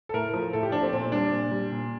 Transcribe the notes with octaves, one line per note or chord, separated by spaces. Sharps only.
A4
A2 A#4
F3
A2 A4
G4
F3 D4
C4
A#2 C4
G3 D4
A#2
G3
A#2